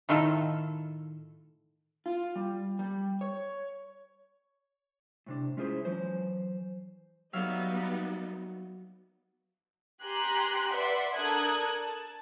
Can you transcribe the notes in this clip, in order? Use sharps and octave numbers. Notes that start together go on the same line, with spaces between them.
A2 D#3 F4 A4
F4
G3
G3
C#5
A2 C3 D4
G#3 C#4 E4 F4 G#4 C5
E3 F#3 C5
F#3 G3 B3 D#4 E5 F5
G4 G#5 A#5 C6 F#6
B4 D5 E5 F#5 C6
D4 A4 A#4 D#6 F#6 G#6
A5